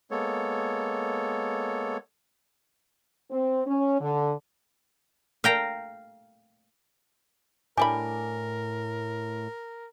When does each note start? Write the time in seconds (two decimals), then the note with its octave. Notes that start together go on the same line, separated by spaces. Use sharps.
0.11 G#3 A#3 B3 A4 C#5
3.31 C4
3.67 C#4
4.00 D3
5.44 F5 G5 A#5
7.78 A2 G3 D4 A#4 G#5 B5 D6